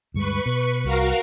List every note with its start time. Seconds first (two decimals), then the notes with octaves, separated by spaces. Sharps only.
0.14 D2 G2 G#3 B4 C#6
0.46 B2
0.84 C2 F#4 A#4 F5